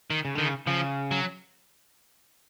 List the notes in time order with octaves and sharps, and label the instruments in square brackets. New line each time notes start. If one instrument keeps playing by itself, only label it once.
[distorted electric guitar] D#3
[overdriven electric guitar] C#3
[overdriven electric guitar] D3 [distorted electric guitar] D#3
[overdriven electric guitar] C#3
[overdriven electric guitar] C#3 [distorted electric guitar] F3
[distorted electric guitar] F#3